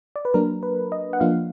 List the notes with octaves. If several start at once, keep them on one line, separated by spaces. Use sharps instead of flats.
D5
B4
F#3 A#3 D4 A#4
B4
D#5
F#5
F3 A#3 D4 F4 F5